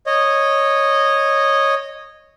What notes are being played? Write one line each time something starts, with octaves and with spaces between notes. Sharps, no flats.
C#5 D#5